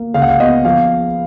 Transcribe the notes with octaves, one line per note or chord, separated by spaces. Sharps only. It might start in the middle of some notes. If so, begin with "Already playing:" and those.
Already playing: A#3
C#2 F5
F#5
F5
B3 D#5
F3 F5